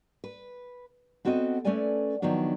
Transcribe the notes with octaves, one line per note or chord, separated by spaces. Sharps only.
B4
B3 C4 F#4 A4 D5 D#5
A3 C#4 A4 B4 D5 G#5
D#3 F3 F#3 B3 D4